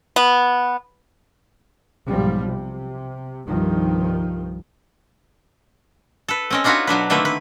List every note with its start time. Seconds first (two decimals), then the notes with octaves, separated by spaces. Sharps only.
0.16 B3
2.07 B1 G#2 F3 G3
2.44 C3
3.46 C2 G2 D#3 F3
6.28 A4 B4
6.50 C4 C#4 D#5
6.64 D4 D#4 F4 F#4 B4 C#5
6.87 B2 F#3 D4 B4
7.10 D3 D#3 A3 A#3 C4 B4
7.25 B4